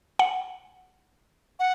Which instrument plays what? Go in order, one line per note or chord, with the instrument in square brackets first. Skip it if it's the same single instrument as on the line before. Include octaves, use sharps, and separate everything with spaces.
[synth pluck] F#5
[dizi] F#5